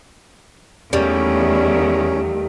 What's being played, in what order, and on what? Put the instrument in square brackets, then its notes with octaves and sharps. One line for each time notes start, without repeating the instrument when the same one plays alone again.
[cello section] E2 D#3 A3 [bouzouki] G3 A#3 [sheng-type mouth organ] C#4